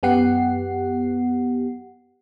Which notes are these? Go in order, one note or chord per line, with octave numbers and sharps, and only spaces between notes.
F#2 B3 G4 F#5 C7